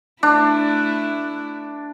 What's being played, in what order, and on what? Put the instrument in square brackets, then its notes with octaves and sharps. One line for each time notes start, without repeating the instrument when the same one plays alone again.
[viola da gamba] A3 E4 [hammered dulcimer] D4